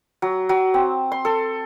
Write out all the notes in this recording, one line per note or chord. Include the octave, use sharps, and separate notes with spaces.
F#3
F#3
C4
C6
A4